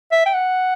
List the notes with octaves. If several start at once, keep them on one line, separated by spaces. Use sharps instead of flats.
E5
G5
F#5